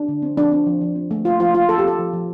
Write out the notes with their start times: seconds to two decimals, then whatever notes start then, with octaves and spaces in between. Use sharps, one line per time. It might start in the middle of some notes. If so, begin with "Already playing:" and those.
Already playing: D4
0.08 D3
0.22 C4
0.37 F3 D4
0.52 C4
0.66 F3
0.81 F3
0.96 C4
1.11 A3
1.25 F3 F4
1.40 F3 F4
1.54 F3 F4
1.69 F3 A4
1.79 G4
1.84 C4 A4
1.98 F3
2.13 F3